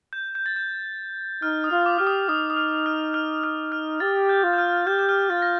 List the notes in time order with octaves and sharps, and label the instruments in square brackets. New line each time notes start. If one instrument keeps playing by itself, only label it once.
[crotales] G6
G6
A6
G6
[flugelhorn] D#4 [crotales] F6
[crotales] D#6
[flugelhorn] F4
[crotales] D6
[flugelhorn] G4 [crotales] F6
[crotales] D#6
[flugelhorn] D#4 [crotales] D#6
[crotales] D#6
F6
F6
F6
F6
F6
[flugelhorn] G4 [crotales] A6
[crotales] G6
[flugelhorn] F4
[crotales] G6
F6
[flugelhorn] G4 [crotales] G6
[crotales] G6
F6
[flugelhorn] F4 [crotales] A6
[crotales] A#6